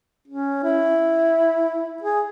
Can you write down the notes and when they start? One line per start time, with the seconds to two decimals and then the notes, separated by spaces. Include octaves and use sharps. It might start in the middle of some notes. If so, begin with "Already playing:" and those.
0.28 C#4
0.63 E4
2.02 G#4